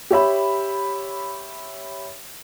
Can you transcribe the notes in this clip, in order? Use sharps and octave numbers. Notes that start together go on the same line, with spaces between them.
G4 C#5 E5 B5